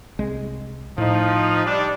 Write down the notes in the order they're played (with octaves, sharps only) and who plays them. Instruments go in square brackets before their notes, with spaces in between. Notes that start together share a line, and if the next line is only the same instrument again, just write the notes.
[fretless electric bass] C2 G#3
[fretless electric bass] A2 [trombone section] F3 D#4
[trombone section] G3 D4